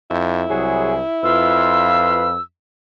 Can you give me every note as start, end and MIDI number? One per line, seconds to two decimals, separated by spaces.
0.10 0.44 41
0.10 2.27 64
0.50 1.01 36
0.50 0.95 54
0.50 0.95 68
1.24 2.38 41
1.24 2.32 65
1.24 2.32 71
1.24 2.40 88